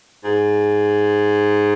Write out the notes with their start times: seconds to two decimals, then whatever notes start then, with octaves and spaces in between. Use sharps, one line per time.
0.24 G#2